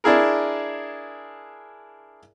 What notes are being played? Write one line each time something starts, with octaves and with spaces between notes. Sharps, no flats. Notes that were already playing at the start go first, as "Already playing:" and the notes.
D4 E4 G#4 A#4